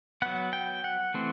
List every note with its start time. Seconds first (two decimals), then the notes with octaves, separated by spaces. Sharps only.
0.22 F#3 B3 F#5
0.53 G5
0.84 F#5
1.14 E3 A3 C4